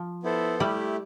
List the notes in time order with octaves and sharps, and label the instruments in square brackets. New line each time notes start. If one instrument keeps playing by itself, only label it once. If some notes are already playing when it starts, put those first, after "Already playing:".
Already playing: [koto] F3
[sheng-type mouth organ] B3 E4 A4 C5
[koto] G3 [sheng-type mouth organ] A3 E4 G4